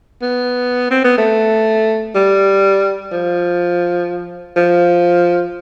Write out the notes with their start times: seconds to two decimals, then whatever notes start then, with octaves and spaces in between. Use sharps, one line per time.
0.22 B3
0.91 C4
1.04 B3
1.18 A3
2.15 G3
3.12 F3
4.56 F3